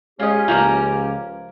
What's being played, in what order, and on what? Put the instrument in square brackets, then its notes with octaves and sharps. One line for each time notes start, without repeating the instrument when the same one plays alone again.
[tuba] G#3 [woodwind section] C#4 G4 [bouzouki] F4 D#5
[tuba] C#2 [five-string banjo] F3 A3 A#3 [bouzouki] A#5